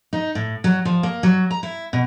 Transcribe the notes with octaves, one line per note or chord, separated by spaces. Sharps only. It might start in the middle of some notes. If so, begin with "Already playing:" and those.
D#4
A2
F#3
F3
A#3
F#3
A#5
E4
B2